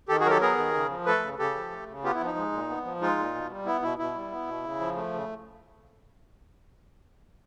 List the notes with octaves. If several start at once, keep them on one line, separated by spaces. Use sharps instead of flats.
D#3 G4 A4
F#4 G#4
F#3 G4 A4 A#4
B3 G#4 A#4
D#3
C#3
F3
A3 A4 B4
C#3
C#3 G4 A4
F3
A3
C#3
B3 F4 G4
E4
F3
D#4
G#3
A#2
B3
F3
G#3 D#4 F4
A#2
B2
G3
B3 E4
B2 E4
B2 E4
G3
B3
B2
C#3
F3
A3
C#3